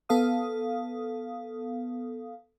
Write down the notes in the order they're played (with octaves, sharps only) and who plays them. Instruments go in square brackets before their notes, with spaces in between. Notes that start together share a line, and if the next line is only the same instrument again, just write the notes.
[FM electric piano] B3 A4 F5 D#6